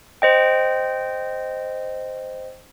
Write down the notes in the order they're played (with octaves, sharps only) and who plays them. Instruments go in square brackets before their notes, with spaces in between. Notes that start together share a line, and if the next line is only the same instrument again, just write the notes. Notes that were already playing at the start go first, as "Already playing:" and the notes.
[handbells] C5 D#5 G5